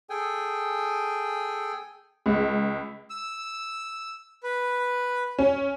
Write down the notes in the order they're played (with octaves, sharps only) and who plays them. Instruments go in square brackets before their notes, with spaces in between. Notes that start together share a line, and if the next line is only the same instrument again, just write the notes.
[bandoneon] G#4 A4 G5 G#5
[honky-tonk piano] C#2
[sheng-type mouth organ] E6
B4
[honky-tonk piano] C#4